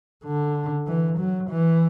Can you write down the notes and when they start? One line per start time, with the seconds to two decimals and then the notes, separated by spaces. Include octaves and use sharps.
0.24 D3
0.87 E3
1.18 F#3
1.50 E3